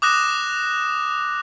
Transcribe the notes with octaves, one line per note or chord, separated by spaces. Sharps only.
D6 D#6 F#6 A#6 E7 F7